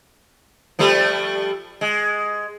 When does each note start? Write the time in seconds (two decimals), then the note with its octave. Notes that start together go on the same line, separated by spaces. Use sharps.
0.79 F3 G3 A3
1.81 G#3